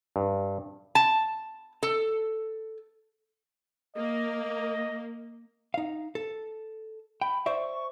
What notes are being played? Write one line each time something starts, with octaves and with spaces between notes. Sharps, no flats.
G2
A5
A4
A#3 D#5
D#4 F5
A4
G5 B5
C5 D5 E5 C#6